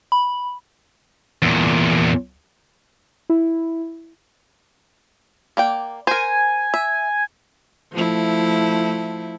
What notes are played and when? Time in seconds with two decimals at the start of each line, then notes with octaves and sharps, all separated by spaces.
0.12 B5
1.42 E2 A#2
3.30 E4
5.57 A#3 D5 G5
6.07 A#4 C5 G#5
6.74 E5
7.93 F3 A3 E4